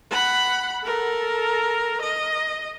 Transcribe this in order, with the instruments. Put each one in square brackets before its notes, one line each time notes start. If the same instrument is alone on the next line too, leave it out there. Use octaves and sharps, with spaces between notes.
[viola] F#5 B5
A4 A#4
D#5